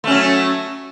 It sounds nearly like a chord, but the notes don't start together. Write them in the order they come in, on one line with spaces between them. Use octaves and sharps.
A3 C#4 F#3